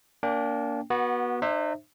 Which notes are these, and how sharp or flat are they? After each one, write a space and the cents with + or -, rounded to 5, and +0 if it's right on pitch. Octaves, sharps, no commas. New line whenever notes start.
A#3 +0 D4 -30 G5 +10
B3 -25 F#4 +0
D#4 -40 C5 +25 E5 +0